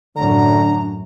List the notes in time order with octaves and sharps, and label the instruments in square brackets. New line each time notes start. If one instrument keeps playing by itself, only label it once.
[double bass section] F#2 A2 [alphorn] D3 [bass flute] D4 [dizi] A#5